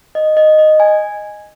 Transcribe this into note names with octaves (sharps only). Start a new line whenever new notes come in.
D#5
D#5
D#5
G#5